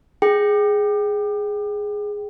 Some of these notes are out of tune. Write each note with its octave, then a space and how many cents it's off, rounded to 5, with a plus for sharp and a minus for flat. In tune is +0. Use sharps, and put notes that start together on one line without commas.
G#4 +0 G5 -10